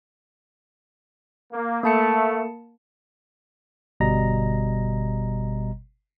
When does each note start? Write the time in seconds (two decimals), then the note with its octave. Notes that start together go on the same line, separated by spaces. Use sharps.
1.52 A#3
1.83 A3 A#3 A5 C#7
4.00 G1 B2 G3 D#5 A#5 A#6